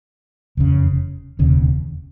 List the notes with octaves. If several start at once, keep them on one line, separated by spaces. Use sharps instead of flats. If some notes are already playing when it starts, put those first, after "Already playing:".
F1 E2 C#3
E1 D#2 C#3